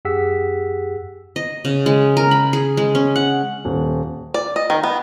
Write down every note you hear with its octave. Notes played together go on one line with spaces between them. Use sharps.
F#2 G4 G#4 F#5 E6 B6
D#5
C#3
G#3
A#4
B5
G#4
G#3
C#4
F#5
D#1
D5
D#5
D#3
B3